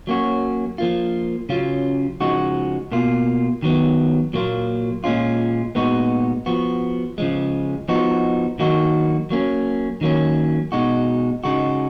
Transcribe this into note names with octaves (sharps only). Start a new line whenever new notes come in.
F#3 A#3 C#4 F#4
F3 A#3 F4
C#3 F#3 C#4 F4
C#3 F3 G#3 D#4 F#4
B2 A#3 F4
D#3 F#3 B3
A#2 F#3 A#3 F4
A#2 G#3 C#4 F4
A#2 G#3 B3 D#4 F#4
F3 B3 F#4
C#3 F3 G#3
F3 B3 D#4 F#4
D#3 F#3 A#3 D#4 F#4
F#3 A#3 C#4
D#3 F#3 A#3 C#4
B2 G#3 D#4 F#4
C#3 G#3 D#4 F#4